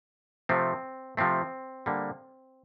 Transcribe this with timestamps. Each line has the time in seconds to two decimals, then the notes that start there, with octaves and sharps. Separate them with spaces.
0.49 C3 F3 A3 C4
1.17 C3 F3 A3 C4
1.86 D3 G3 A#3